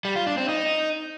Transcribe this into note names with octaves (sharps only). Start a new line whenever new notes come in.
G3
F4
D4
C4
D#4